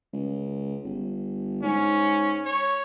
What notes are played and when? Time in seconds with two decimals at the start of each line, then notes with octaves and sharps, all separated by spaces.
0.14 C#2
0.84 G1
1.63 G#2 C#4
2.46 C#5